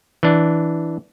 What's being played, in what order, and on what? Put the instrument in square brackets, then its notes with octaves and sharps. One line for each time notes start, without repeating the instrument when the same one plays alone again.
[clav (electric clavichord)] E3 D4